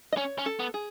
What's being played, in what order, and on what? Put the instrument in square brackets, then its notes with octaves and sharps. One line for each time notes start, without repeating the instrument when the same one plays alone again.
[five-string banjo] D#5
[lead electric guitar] C#4 [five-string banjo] C#5
[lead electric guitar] C#4
[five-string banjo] A4
[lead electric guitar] B3
[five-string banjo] G#4